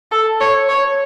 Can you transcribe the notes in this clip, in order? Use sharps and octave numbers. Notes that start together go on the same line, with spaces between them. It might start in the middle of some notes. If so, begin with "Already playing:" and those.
A4
C#5
C#5